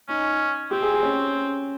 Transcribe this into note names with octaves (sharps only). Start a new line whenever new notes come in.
C#4 D#4
C4 G4
G#4
G4
C#4